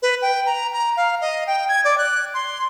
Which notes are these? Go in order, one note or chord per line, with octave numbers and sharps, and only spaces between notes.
B4
G5
A#5
A#5
F5
D#5
G5
G#6
D5
F#6
C6